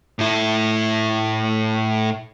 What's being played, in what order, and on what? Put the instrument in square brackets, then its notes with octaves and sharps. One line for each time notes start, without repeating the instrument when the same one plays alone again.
[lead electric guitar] A2 E4